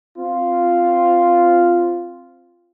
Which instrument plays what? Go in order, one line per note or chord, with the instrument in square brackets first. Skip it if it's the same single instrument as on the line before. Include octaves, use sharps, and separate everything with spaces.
[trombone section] C4 F4